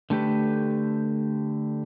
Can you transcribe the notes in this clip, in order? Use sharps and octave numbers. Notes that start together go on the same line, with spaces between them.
D3 A3 G4 B4